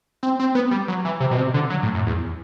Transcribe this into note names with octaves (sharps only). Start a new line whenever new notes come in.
C4
C4
B3
G3
F#3
E3
C3
B2
C3
D3
F#3
A2
F#2
E2